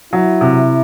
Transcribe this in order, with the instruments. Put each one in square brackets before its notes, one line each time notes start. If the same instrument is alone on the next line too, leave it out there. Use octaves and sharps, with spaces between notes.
[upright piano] F#3 [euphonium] E4
[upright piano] C3